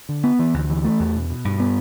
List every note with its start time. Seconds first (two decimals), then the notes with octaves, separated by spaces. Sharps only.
0.09 D3
0.24 B3
0.39 E3
0.54 D2
0.70 E3
0.84 A3
1.00 E2
1.15 B2
1.30 B2
1.45 G2
1.60 B3